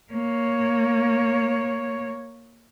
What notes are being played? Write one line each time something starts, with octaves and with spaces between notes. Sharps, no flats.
A#3 C#5